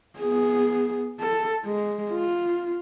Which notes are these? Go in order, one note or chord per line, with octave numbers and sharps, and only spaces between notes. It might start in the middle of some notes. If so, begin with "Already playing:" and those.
B3 G#4
A4
G#3
F4